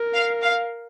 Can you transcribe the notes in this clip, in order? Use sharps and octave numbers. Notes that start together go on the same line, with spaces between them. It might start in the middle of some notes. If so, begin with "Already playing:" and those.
Already playing: A#4
F5
F5